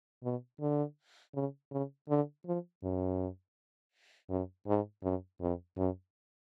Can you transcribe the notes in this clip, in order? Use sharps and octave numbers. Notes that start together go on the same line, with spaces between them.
B2
D3
C#3
C#3
D3
F3
F#2
F#2
G#2
F#2
F2
F#2